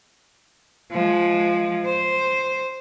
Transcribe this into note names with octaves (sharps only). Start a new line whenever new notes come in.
F3 G#3
C5